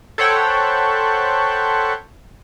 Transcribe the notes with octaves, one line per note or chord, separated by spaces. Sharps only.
A4 C5 C#5 F#5 G5 B5